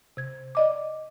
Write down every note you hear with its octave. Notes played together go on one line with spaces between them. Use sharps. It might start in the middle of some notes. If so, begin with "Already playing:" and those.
C3 G#6
D5 D#5 D6